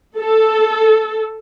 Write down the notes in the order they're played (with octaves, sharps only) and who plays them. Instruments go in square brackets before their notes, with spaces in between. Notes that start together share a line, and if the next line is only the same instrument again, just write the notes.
[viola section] A4